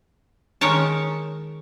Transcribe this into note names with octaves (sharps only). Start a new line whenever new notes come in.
D#3 G#3 C#4 A#4 C#5 A5